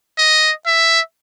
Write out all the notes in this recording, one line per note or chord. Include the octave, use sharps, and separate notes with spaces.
D#5
E5